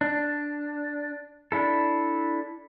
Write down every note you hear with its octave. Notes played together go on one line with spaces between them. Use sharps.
D4
D4 E4 A4